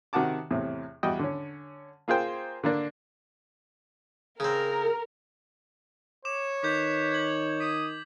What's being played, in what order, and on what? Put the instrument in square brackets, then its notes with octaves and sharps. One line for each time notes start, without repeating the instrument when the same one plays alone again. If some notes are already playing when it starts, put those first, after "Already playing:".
[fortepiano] C3 D#3 F#4 F#5 A5 D6
E2 A2 C3
E2 G3 F#4 D#5 G5
D3 C#4
A#3 F4 G#4 C5 G5
D3 A#3 D4
[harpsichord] C#3 C4 [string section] A#4
[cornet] C#5 [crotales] D6 E7
[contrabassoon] D#3 [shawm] B4 [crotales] D6 G6
[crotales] G#6 F#7
[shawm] D#6 [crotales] B6